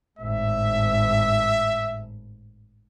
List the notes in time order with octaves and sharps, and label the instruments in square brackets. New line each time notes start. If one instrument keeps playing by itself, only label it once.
[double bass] G#1 A2 [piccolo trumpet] E5